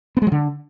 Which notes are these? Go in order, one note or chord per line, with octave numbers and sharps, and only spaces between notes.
B3
G#3
F#3
D3